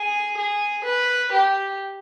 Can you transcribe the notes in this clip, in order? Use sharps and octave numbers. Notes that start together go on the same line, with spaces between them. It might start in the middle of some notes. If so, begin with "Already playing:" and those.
Already playing: G#4
G#4
B4
G4